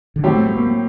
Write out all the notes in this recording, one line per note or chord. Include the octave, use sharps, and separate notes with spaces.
D3
A2 D#3 F#3 C4 G4
A3
A3
A#3
A#3